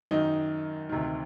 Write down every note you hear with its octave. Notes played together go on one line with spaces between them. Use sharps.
F#2 D#3 D#4
D2 C3 D#3